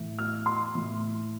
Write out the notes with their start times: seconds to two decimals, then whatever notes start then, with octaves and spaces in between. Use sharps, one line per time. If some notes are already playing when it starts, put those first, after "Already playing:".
Already playing: A2 E3
0.19 F6
0.46 C6
0.75 A2 E3